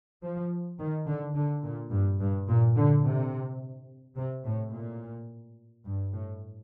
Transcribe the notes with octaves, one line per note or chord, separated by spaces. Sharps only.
F3
D#3
D3
D3
A#2
G2
G2
A#2
D3
C3
C3
A2
A#2
G2
A2